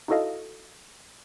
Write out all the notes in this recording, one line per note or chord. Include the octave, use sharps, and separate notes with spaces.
D#4 E4 F#4 A4 D#5 F5